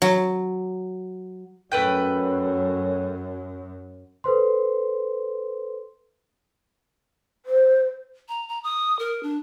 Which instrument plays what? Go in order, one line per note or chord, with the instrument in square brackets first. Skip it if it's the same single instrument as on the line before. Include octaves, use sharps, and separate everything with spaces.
[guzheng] F#3
[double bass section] F#2 [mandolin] A3 B4 G5
[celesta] A4 B4 C5 C6
[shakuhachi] C5
[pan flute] A#5
A#5
D#6
A#4
D4